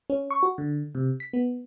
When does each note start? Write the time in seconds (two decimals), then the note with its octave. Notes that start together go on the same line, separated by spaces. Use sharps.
0.10 C#4
0.31 C#6
0.43 F#4
0.58 D3
0.95 C3
1.20 B6
1.33 B3